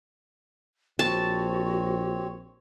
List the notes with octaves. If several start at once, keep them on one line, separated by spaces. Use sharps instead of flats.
A#1 C4 F#4 C#5 A5